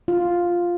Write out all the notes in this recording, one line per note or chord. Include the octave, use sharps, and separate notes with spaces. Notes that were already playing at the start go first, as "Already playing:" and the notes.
F4